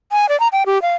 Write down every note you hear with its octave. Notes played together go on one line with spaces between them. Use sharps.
G#5
D5
A#5
G5
G4
F5